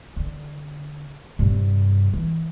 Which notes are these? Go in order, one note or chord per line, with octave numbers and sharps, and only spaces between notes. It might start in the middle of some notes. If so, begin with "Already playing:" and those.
D3
G2 C3
E3